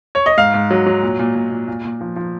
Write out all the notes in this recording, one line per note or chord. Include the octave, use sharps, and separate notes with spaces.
C#5
D#5
G#2 F5
G#2
F#3
F#3
A#2
A#2
A#2
A#2
A#2
A#2
F3
F3